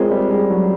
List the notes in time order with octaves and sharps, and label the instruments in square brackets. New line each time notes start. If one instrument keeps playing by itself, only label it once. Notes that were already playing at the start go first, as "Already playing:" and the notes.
Already playing: [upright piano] G#3 [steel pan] C4 F4 A#4 C#5
[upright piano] G3
G#3
F#3